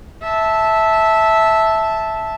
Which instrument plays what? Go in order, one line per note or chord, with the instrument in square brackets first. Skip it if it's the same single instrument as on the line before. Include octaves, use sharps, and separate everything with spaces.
[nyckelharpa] E5 A5